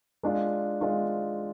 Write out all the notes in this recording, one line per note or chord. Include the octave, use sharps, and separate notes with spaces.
G#3 D4 F4
G#3 D4 F4